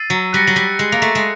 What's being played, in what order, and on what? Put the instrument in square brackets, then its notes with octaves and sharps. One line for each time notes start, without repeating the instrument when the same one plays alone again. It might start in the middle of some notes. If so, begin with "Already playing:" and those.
Already playing: [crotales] E6 A6 C7 D#7
[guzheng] F#3
[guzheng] G3 [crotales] F#6 A#6 C#7
[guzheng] F#3
G3
G#3
A#3
A3
G#3